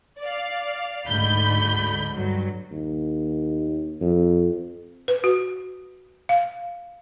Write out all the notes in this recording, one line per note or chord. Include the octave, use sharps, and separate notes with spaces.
D5 F5
D2 G#2 D3 B5 G6
G2 F#3
D#2
F2
B4
F#4
F5